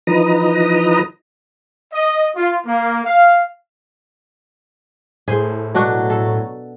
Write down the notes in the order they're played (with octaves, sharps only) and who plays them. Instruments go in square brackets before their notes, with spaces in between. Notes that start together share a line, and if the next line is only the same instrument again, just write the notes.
[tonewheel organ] E3 F3 D#4 B4 A#5 D#6
[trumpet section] D#5
F4
A#3
F5
[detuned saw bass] A2 [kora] G#4 C5
[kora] B2 D4 F#4 [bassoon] F#3
[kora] A4